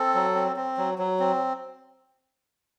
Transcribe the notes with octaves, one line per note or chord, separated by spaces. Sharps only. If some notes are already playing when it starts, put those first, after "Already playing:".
Already playing: C4 A4
F#3
C4
C4
F#3
F#3
C4